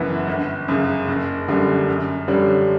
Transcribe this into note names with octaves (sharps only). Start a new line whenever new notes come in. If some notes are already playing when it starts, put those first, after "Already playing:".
Already playing: F#1 F#2 E3 B3 E4
G1
F#2 C#3
F#1
F#2 D3 G3
F#2
D3 G3 C#4